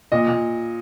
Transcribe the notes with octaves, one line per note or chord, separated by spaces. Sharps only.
A#2 D#5
A#2